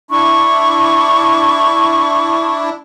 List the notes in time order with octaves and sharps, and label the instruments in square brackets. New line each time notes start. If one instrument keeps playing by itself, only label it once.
[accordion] D4 E4 [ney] C#6